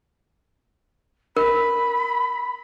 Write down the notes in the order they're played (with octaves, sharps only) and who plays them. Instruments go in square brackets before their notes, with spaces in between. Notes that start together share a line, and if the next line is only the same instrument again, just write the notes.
[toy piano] A#4 [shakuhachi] B5